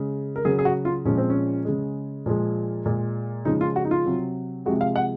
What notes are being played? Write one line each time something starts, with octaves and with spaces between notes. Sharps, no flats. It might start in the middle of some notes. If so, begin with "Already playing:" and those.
Already playing: C#3 G#3
A#4
C#3 F#3 G#4
G#4
F#4
F4
A#2 F3 G#3 C#4
C4
C#4
C#3 G#3
A#2 F3 G#3
A#2 G#3
C#3 F3 G#3 D#4
F4
F#4
D#4
F4
C3 F#3
C3 F3 G#3 F#4
F5
F#5